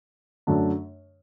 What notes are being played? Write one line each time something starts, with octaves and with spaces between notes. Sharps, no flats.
F#2 D3 A3 D4